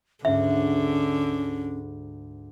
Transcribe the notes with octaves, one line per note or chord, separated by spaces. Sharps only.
D2 G#2 D3 C#4 E5